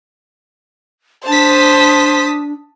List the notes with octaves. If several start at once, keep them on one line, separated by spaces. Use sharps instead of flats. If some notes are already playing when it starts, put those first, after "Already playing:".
D4 C5 A5 D#6 B6